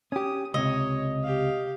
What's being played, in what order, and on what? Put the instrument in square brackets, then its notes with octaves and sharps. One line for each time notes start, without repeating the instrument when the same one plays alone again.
[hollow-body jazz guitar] C#4 G4 [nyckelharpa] D#6
[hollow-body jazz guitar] C#2 C3 [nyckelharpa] C#5 [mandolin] D#5
[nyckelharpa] G4 F5